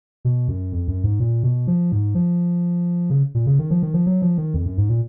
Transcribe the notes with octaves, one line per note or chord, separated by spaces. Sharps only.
B2
F#2
F2
F#2
G#2
A#2
B2
F3
G#2
F3
C#3
A#2
C#3
D#3
F3
D#3
F3
F#3
F3
D#3
F2
F#2
G#2
A#2